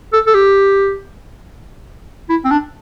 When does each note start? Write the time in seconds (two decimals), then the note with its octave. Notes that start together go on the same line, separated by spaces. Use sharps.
0.13 A4
0.27 A4
0.34 G4
2.29 E4
2.45 C4
2.51 D4